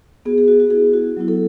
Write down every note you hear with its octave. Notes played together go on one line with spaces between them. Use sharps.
B3 F#4 G#4
G#4
F#4
F#4
B3 E4 G#4
F#4
F#3 B3 E4
A4